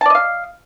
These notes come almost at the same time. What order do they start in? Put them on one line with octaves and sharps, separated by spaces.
A5 D5 D#5 F5